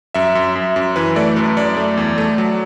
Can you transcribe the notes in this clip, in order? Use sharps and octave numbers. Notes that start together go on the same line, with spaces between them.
F#2 E5
F#2
F#2
F#2
E3 B4
A3 D5
F#2 B4
F#2 D5
A3
E2
A3
F#3